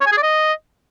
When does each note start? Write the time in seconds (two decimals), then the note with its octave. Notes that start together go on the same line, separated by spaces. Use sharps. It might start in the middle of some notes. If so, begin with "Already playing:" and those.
0.01 C#5
0.06 G#5
0.12 G#4
0.17 D5
0.23 D#5